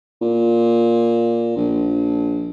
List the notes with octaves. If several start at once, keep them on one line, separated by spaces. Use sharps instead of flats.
A#2
A#1